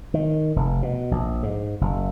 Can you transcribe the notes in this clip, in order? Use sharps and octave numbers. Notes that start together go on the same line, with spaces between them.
D#3
F1
B2
A#1
G#2
F#1